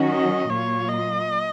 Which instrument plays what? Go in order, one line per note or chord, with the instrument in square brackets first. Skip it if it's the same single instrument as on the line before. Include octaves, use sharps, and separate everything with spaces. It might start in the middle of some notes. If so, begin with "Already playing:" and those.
Already playing: [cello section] D#3 F#3 C#4 F#4
[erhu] D#5
[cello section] A#2 F#3 A#3 F4 [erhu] C#5
[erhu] D#5